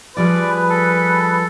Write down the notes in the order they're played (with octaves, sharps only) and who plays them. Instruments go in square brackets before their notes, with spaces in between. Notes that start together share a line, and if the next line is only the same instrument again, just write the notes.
[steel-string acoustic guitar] F3 G3 F4 [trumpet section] G#4 B4 [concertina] D5
[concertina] A4